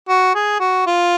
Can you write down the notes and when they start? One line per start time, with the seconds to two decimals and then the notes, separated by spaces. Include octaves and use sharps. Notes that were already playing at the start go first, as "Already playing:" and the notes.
0.08 F#4
0.35 G#4
0.60 F#4
0.87 F4